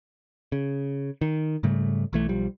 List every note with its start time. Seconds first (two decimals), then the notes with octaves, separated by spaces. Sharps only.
0.52 C#3
1.21 D#3
1.63 G#2 C#3 G3 A3
2.13 B1 E3 A3
2.29 B1 F3 G3